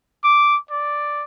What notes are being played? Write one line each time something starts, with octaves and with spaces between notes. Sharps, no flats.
D6
D5